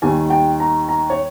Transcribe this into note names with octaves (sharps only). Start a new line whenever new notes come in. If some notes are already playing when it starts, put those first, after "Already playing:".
D#2 D#3 G3 G#5
G5
A#5
A#5
C#5